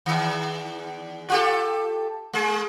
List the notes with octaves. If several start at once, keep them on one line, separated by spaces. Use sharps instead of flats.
E2 D#3
F4 G4 A4
G#3 G#4